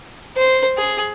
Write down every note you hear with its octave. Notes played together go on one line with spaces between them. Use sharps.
C5
G#4